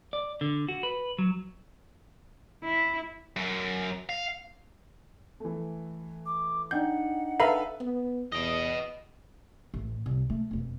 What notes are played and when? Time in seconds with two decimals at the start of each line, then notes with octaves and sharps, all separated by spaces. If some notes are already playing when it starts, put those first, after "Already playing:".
0.13 D5
0.41 D3
0.68 F#4
0.83 B4
1.18 F#3
2.64 E4
3.36 F#2
4.09 F5
5.40 E3 A3
6.26 D6
6.71 D4 D#4 F#5 G5 G6
7.40 A4 B4 E5 F5 A#5 B5
7.80 B3
8.32 E2 B4 D#5
9.74 A1
10.06 C2
10.30 A3
10.51 E1 F2